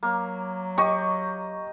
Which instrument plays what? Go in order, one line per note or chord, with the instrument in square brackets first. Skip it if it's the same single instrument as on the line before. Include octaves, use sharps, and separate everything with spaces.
[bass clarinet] F#3 [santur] A#3
[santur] G4 D#5 [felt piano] C#6